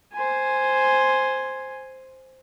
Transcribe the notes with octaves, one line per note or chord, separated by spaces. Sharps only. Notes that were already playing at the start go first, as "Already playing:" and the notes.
C5 G#5